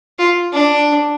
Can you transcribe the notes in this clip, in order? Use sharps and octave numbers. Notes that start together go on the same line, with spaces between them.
F4
D4